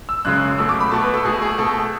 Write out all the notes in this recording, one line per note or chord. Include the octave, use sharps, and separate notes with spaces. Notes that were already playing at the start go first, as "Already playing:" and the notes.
E6
F#2 C#3 G#3 F#6
B2 A3 E6
D6
B5
B2 A3 A5
B4
A4
B2 A3 G#4
G#4
B2 A3 A4